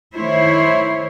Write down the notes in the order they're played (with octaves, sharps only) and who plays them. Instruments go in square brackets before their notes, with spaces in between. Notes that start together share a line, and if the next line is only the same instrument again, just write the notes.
[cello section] D#3 A3 E4 C5 C#5